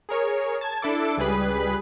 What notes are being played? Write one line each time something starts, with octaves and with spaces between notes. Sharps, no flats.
G#4 A#4 C#5
A5 G#6
D4 E4 A4 D6
C#2 G3 G#4 B4 B5